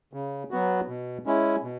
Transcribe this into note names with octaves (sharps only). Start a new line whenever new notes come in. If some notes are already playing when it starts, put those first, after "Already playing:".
C#3
F#3 B3 F#4
B2
G#3 C#4 E4
B2